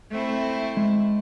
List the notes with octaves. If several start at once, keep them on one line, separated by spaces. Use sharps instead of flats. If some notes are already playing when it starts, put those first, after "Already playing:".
A3 C4 E4
G#3